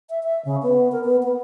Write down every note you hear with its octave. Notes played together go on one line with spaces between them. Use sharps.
E5
E5
C#3
B3
A#4
B3
B3